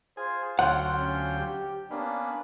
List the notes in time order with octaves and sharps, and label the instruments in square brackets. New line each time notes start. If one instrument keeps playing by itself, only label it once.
[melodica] F4 [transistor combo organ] G#4 [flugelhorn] C5
[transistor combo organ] D2 F#3 G5 [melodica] F4 C5 [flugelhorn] C#5 [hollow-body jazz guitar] F#5
[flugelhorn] C#4
G4
[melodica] A#3 C#4 [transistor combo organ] B3 [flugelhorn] D4